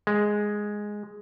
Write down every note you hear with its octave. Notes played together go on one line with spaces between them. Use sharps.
G#3